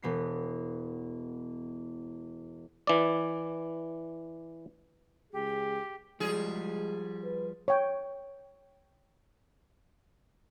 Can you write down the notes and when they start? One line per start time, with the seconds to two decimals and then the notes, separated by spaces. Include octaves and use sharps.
0.02 E1 B3 C7
2.87 E3 D5
5.33 C#2 G4 G#4
6.20 F3 G3 G#3 G#4
7.24 B4
7.68 C#5 G5